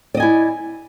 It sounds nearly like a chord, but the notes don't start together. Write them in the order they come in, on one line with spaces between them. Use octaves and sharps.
D5 D#5 G#5 E4